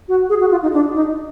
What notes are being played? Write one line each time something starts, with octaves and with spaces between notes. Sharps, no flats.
F#4
G#4
F#4
F4
D#4
D4
D#4